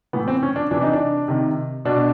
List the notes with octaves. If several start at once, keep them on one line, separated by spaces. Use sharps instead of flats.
A2 E3 B3
C4
C#4
D4
C3 E3 D4
D#4
D4
C3 D#3
B2 D4